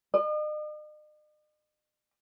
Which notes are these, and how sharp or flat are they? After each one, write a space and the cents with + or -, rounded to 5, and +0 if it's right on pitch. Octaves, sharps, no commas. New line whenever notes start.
D#5 -45